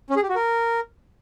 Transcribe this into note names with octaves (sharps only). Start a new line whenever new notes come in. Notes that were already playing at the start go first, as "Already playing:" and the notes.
C#4
G#4
G4
F#4
A#4